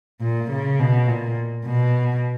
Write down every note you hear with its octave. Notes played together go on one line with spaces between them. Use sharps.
A#2
C#3
B2
A#2
B2